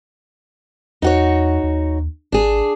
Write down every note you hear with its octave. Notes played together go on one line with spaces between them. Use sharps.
E2 D#4 F#4 C#5
D#2
G#1 D4 G#4